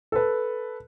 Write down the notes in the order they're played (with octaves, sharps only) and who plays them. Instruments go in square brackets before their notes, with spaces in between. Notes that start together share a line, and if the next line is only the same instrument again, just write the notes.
[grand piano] A4 B4